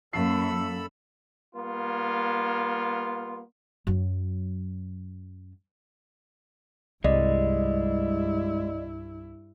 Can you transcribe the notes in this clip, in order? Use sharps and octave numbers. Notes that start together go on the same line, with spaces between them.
F#2 A#3 A4 B5 E6 C7
G3 A#3 B3 F4
F#2 F#3
C2 G2 G3 G#3 E4 D5 D#5